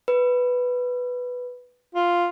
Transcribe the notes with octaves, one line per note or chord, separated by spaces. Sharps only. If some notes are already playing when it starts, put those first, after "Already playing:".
B4
F4